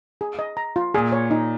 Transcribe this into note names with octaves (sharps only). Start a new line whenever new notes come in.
G#4
D#5
A#5
F4
A#2 G#4
C#5
D#4